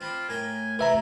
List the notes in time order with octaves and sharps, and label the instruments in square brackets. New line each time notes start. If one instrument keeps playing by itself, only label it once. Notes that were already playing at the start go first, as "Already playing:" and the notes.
[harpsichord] C4 B5 D6 [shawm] F4
[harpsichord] A2 A#4 G5 [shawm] G#5
[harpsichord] C3 E3 A3 [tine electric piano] B4 E5 A#5